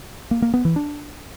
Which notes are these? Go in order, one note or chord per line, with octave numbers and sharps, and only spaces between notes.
A#3
A#3
B3
E3
D4